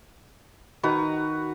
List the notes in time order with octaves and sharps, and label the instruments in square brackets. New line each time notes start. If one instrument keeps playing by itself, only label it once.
[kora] D#3 [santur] F#4 B4 A#5